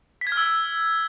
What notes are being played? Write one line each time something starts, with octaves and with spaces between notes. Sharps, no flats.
B6
G#6
F6
E6